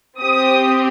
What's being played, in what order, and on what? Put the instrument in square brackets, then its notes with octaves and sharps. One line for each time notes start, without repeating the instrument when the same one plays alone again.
[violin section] C4 G4 D#6